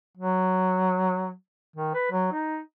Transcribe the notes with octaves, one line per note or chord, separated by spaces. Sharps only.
F#3
D#3
B4
F#3
D#4